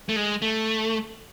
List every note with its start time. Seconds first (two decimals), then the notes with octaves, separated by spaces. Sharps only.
0.09 A3
0.16 G#3
0.42 A3